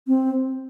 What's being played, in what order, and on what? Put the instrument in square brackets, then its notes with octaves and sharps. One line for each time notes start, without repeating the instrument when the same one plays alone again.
[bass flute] C4